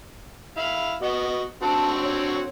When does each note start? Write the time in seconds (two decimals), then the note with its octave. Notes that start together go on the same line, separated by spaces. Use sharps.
0.57 E4 F5
1.02 B3 F#4 D#5
1.62 D3 C4 F#4 A5
2.03 C#5